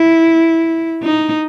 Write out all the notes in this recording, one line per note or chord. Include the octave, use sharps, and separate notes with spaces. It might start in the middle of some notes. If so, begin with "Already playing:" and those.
Already playing: E4
D#4